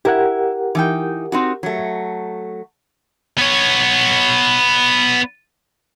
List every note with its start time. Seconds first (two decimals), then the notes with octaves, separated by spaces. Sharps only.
0.05 E4 G4 A#4 F#5
0.75 E3 D#4 G5
1.32 C4 D#4 F#4
1.63 F#3 A3
3.38 B3 C#5